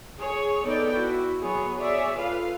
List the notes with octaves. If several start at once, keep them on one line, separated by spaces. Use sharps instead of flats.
G#4 C#5
B3 D#4 A4 D5 G5
E4 F#4
F#3 B3 G#4 C#5
G#4 C#5 D5 E5
F4 A4 B4 F5